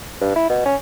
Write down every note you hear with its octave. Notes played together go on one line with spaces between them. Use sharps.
G2
E4
B2
C#4